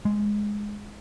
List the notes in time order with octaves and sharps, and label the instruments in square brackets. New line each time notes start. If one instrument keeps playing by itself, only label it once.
[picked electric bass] G#3